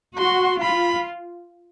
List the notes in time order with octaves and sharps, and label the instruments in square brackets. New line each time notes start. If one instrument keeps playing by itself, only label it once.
[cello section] F#4 [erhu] C6
[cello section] F4 [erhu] B5